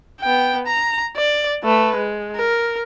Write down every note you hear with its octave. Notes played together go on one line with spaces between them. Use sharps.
B3 G5
A#5
D5
A3 B4
G#3
A#4